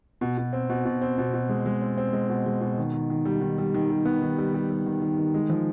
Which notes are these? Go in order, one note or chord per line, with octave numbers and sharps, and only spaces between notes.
B2
B2
C4
B2
B2
C4
B2
B2
G#3
G#3
C4
C4
G#3
B2
G#3
B2
D#3
D#3
D#3
G3
D#3
G3
D#3
G3
B3
D#3
G3
G3
G3
D#3
D#3
D#3
G#3
F3